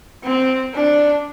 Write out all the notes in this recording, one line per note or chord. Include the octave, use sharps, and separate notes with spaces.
C4
D4